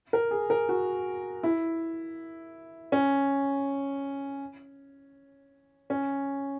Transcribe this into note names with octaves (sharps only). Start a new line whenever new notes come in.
A#4
G#4
A#4
F#4
E4
C#4
C#4